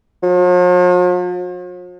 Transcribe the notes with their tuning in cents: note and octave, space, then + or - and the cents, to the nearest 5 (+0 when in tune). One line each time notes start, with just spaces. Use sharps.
F3 +45